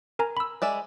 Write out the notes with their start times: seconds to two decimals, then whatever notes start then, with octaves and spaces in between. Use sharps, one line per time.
0.19 A#4 G#5 A#5
0.37 B5 E6
0.62 G#3 D5 E5